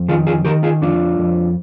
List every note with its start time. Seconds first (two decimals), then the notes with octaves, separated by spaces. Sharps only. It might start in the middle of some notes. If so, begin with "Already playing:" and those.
Already playing: F2
0.08 D#3 F4 G#4
0.27 F4 G#4
0.45 D#3 G4 A#4
0.63 F4 G#4
0.81 F2 D4 F4
1.19 F2